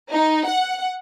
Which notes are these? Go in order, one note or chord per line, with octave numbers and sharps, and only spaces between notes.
D#4
F#5